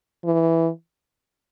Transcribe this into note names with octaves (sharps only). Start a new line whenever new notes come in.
E3